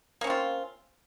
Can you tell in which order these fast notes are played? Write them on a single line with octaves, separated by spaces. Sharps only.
A#3 C#4 C4 F4